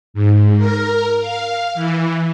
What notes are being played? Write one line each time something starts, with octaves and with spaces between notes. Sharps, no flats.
G#2
A#4
F5
E3